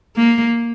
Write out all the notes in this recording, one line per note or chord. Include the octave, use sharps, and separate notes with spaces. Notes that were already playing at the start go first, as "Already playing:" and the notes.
A#3